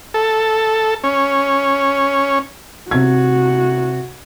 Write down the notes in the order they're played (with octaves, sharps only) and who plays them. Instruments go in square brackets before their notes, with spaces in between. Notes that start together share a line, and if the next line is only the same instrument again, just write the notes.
[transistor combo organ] A4
C#4
[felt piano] C3 G#6 [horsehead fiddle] F#4